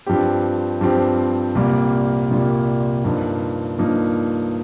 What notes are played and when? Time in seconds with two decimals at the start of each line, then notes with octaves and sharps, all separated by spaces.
0.06 G2 F3 C4 G4
0.81 G2 F3 C4 G4
1.55 C2 A#2 G3 A#3
2.30 C2 A#2 G3 A#3
3.04 G2 F3 A#3 D#4
3.78 G2 F3 A#3 D#4